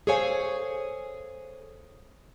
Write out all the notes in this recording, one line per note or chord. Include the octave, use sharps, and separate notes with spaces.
G#4 A4 C5 C#5 F5 G#5